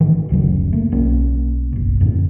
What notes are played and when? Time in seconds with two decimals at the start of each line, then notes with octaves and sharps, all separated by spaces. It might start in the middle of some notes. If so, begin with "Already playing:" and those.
0.01 A1 D#3 E3
0.29 F#1 D2 C#3 F#3
0.73 A3 A#3
0.92 B1 A#3 C#4
1.73 F#1 B1
2.01 F2 A2 D3